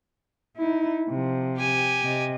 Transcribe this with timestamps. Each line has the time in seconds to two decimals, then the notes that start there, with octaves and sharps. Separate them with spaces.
0.57 D#4 E4
1.09 C3 F3
1.57 G4 G#5
2.03 C3 D#5